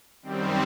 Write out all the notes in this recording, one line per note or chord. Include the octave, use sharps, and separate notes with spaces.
F#2 D#3 G3 C4